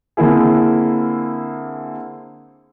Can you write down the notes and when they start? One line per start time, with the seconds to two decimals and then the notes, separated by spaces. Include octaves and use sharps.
0.17 D3 A#3 C4 E4 G#4